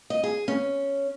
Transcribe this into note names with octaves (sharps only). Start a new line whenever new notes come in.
D#5
G#4
C#4